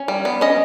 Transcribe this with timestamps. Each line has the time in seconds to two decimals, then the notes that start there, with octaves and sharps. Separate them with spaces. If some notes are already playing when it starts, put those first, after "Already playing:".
Already playing: C#4
0.08 G3
0.25 B3
0.41 C#4 D#5